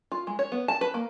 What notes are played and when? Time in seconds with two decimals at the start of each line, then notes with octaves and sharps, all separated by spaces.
0.12 F4
0.27 G#3
0.39 C#5
0.52 B3
0.68 A5
0.81 B4
0.94 A#3